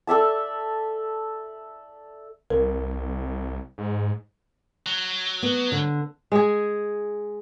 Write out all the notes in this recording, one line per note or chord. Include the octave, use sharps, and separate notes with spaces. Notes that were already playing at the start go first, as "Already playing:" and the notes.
A4 D5 E5 A5
C2 A#4
G#2
F#3
B3
D3
G#3 G#4